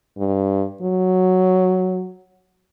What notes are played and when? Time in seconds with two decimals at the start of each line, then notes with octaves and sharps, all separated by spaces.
0.18 G2
0.82 F#3